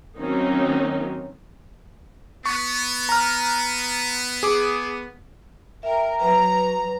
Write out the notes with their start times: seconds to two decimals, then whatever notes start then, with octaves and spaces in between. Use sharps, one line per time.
0.19 D#3 F#3 A#3 C4 C#4 D#4
2.46 B3 C#6
3.09 A#5 F6
4.43 G#4 D6
5.83 A#4 E5 G5
6.20 F#3 B4 A#5